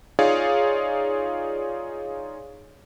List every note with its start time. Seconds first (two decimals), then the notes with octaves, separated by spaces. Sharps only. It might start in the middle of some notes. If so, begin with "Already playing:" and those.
0.19 D#4 F4 G#4 C#5 D5 F5